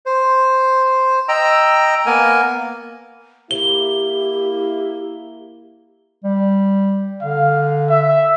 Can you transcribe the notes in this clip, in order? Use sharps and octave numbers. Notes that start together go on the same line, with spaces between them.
C5
D#5 G5 A#5 E6
A#3 B3 A#4 G#5
A#3 E4 G4 G7
G3
D3 F5
E5